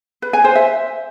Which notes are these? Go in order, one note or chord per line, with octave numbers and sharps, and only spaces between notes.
B4
G#5
C5
E5